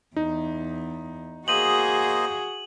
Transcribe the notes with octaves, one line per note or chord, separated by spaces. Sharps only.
E2 D#4
A#3 F#4 G#4 C5 D#5 D#7 F#7